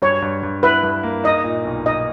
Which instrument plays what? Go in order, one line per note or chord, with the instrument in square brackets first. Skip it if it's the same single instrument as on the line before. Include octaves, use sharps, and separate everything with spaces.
[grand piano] G2 [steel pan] C#5
[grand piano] G2
G2
[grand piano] E4 [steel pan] B4
[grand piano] G2
A#3
[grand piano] D#4 [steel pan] D#5
[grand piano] A#2
B1
[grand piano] D#4 [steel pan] D#5